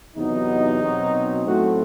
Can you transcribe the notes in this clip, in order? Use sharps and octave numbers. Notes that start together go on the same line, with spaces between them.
E2 C3 F#3 B3 D#4
B2 F#3 C4
A2 F#3 A3 C4 F#4